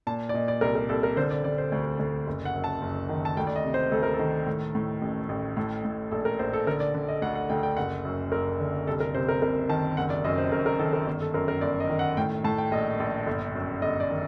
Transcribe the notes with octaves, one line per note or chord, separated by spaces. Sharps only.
A#2 A5
D5
A#2 D#5
D5
C2 A#4
A#4
C2 A4
A#4
D3 C5
D5
D3 D5
C5
D2
D2
F#1
F#5
F#2
A5
F#1
D#3
A5
D2 G5
D5
D#5
C3
C5
D2 A4
A#4
A4
D#3
A2
A2
A1
A1
A2 A4
A2
A#1 A4
A#4
A#1 C5
A4
D3 A#4
D5
D3
D#5
D2 F#5
F#5
D2 G5
G5
F#1 F#5
F#2
F#1 A#4
D3
C2 A4
A#4
C3 C5
A#4
C2 A#4
D#3 A5
F#1 F#5
D5
F#2 D#5
C5
F#1 A#4
A#4
D#3 A4
A#4
G1
A4
F#2 A#4
A#4
G1 D5
D#5
D#3
F#5
A2 G5
A2 A5
G5
A#1 D#5
A#1
G1
F#2
G1 D#5
D5
D#3